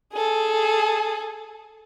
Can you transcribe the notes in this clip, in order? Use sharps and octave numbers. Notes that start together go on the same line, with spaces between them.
G#4 A4